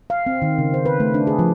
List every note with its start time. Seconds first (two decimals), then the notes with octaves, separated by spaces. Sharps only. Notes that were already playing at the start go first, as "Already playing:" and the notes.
0.10 F5
0.26 C4
0.42 D#3
0.58 C#3
0.74 C5
0.86 B4
1.00 A3
1.14 D4
1.27 G#4
1.39 F3